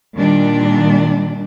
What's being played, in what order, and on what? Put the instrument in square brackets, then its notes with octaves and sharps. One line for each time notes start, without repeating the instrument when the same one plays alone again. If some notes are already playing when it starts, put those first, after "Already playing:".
[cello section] A#2 D#3 G3 D4